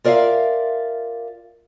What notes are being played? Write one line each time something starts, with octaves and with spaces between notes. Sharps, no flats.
F4 A#4 D5 E5 F5